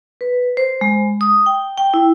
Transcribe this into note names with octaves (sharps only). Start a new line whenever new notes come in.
B4
C5
G#3
D#6
G5
G5
E4